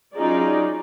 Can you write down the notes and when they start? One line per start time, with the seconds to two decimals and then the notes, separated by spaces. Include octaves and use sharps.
0.14 F#3 C#4 D#4 F4 G#4 D5